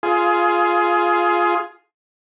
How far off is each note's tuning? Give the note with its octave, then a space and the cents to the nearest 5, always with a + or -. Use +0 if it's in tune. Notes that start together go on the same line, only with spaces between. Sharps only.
F4 +0 G#4 +15